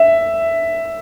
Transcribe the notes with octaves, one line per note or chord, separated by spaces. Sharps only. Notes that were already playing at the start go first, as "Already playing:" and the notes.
Already playing: E5